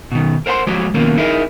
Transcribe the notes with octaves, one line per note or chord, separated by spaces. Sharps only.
B2 D#3
A#4 C5 F#5 A#5 C6
F3 G#3 F#4 G4 C#5
D#2 B2 D#3 F3 A#3 C#4
D#4 E4 G#4 A#4 D#5